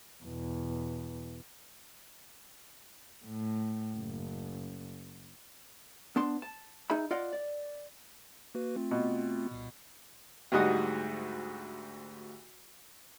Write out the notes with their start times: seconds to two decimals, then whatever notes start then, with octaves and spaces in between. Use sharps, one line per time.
0.24 E2 B2
3.25 A2
3.95 F#1
6.16 B3 D4 A5 C6
6.42 A5
6.90 D#4 G#4 E5 B5
7.11 F4 D5 D#5 F#5
7.33 D5
8.55 A#3 F#4 B4
8.76 A3 C4 F4
8.91 B2
9.51 C2 A#2
10.52 D2 G#2 G3 F#4 D#5 F#5